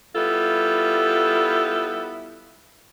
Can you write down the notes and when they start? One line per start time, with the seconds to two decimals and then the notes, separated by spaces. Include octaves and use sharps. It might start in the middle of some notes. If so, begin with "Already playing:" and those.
0.15 G3 B3 E4 F4 A4